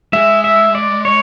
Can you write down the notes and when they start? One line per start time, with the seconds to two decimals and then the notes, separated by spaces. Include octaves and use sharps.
0.13 G#3 E5
0.44 E5
0.75 D5
1.05 C#5